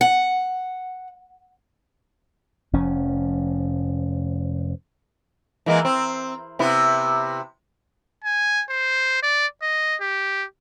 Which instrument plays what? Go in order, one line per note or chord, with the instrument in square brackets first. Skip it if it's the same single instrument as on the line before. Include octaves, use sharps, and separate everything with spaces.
[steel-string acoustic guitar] F#5
[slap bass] F1 F3 C#4
[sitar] E3 G#3 A#3
C4
C3 B3 E4
[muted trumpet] G#5
C5
D5
D#5
G4